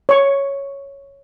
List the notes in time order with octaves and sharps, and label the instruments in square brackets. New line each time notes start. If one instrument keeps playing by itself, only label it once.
[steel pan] C#5 C#6